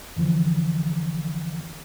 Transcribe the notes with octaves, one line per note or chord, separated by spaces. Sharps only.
F2 D3 E3 F3